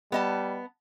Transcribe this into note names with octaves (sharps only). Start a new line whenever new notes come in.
G3 B3 D#5 A5